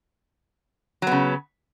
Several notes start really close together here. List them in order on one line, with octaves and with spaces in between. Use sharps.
F#3 B3 C#3